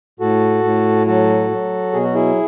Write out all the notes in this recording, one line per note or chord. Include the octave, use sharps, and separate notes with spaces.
A2 F#4 A4
A2
F#3 F#4 A4
F#3
B2 G#4
F#4
E4 G#4